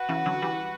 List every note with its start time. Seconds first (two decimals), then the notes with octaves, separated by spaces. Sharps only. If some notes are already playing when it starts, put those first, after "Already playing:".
Already playing: F#4 B4 F#5
0.09 C#3 E3
0.26 D3 F#3
0.42 E3 G3